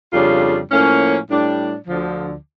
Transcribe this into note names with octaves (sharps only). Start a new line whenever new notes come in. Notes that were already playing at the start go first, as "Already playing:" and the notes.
F2 C#3 G3 D4 F4
A2 F3 A#3 C#4
A2 G3 D4
D2 D3 F3